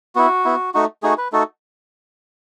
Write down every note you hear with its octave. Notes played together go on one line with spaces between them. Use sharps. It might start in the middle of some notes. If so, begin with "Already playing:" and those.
B3 E4 F#4
B3 E4
A3 D#4 F#4
A3 D#4 F#4 G#4
B4
A3 D#4 F#4 A4